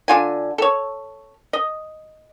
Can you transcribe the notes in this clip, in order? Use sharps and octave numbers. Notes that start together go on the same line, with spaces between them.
D3 F4 G#5
A4 C#5
D#5